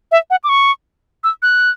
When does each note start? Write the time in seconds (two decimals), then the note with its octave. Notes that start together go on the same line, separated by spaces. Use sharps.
0.12 E5
0.30 F#5
0.44 D6
0.49 C#6
1.24 E6
1.42 F#6